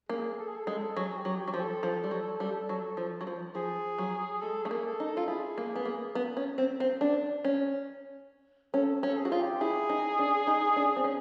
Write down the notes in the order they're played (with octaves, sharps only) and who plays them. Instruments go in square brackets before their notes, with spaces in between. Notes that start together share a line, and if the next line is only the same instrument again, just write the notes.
[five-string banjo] A#3 [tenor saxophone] G#4
[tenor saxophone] A4
G#4
A4
[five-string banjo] G#3 [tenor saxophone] A4
[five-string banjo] F#3 [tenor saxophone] G#4
[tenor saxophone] G4
[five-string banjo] F#3
[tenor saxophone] G4
[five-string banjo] F#3
F3
[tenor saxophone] A4
[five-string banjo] F3
G3
F#3
G3
F#3
F3
F#3
F3
[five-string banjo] F3 [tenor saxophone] G#4
[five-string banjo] F#3
[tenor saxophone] G#4
[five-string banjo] G#3 [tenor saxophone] A4
[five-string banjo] A3 [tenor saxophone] G#4
[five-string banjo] A#3
[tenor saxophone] A4
[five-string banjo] D#4
[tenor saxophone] A4
[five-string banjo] F4
[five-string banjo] E4 [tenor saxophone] G#4
[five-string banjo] A#3
B3
A#3
B3
C#4
C4
C4
D4
C#4
[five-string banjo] C#4 [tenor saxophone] A4
[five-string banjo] C#4
[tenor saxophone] A4
G#4
[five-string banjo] F#4
F4
[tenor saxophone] G4
[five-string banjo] E4 [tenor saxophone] G#4
[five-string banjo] D#4
D4
D#4
D4
C4
C#4